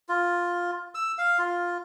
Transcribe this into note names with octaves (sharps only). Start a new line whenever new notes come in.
F4
E6
F5
F4